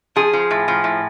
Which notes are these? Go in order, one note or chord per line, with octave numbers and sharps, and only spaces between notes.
F3 G#4
F3
A2
F3
A2